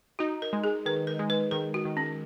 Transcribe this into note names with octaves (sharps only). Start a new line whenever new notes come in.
D#4 F#4
A#4
G#3
G#4
D#3 B4
A#4
G#3
B4
D#3 A#4
F#4
D#3
C#4